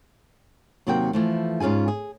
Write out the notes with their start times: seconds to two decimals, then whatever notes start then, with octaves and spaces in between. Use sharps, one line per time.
0.87 D#2 C3 F#3 A#3 F#4 G5
1.13 E3 F3 A3
1.60 G#2 C#4 F4 G#4 G#5
1.88 G#4